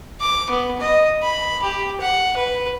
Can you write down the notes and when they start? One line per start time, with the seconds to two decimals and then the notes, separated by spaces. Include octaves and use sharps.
0.21 D6
0.50 B3
0.81 D#5
1.23 B5
1.63 G4
2.01 F#5
2.37 B4